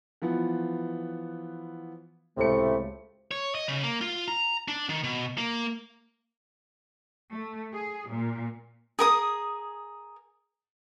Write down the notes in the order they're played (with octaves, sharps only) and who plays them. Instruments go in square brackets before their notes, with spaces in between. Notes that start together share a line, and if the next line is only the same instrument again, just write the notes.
[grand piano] E3 F3 B3
[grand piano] C#2 C#7 [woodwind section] A2 C3 A3
[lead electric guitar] C#5
D#5
C#3
A#3
F4
A#5
D4
D#3
B2
A#3
[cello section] A3
G#4
A#2
[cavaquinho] G#4 A#4 D#6